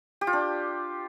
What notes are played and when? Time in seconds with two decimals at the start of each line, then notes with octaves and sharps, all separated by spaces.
0.21 G4
0.27 F4
0.33 D4